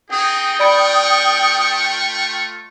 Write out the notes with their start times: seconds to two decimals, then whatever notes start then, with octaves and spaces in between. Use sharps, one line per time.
0.11 C4 D#4 G#4 G5 D#6
0.59 A3 F4 D5 B5 C#6 D7